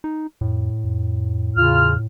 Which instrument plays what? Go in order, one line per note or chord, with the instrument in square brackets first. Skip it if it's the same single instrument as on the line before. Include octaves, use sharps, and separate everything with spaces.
[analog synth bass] D#4
[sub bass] F2 [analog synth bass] A2
[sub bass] F2
[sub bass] E2 [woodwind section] C#3 F4 F6